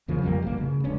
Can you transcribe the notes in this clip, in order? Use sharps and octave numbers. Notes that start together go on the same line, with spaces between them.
E2 C#3 F3 A#3
A1 F2 G3 A#3
G1 C2 B2 A#3
C#3
F1 C#2 C#4 D4